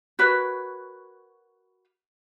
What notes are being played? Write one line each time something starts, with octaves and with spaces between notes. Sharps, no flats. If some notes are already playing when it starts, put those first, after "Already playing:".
F#4 A#4 B4 C#5